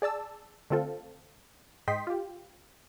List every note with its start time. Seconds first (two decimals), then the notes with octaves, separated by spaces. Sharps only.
0.02 G#4 D5 A5 E6
0.70 D3 A3 C4 F4 A4
1.88 G#2 D#5 G5 C6 B6
2.07 F4 G4